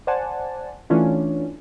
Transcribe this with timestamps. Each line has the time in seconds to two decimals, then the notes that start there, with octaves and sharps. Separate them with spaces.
0.07 C5 D5 F#5 G#5 A5
0.90 E3 A3 C#4 D4 F4